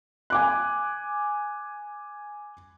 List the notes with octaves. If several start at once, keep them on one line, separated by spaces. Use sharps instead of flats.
G#5 D6 F#6